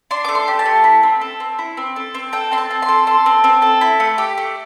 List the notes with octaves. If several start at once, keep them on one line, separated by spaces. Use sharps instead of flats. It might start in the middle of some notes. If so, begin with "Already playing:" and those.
D4 C6
A3 D6
C6
G4
A5
A3
E4
C4
A4
C4
E4
C4
A4
C4
A4 G5
C4 C6
A5
C4
C6
A4
A4 C6
C4
C4
A4
E4
A3
G4
A3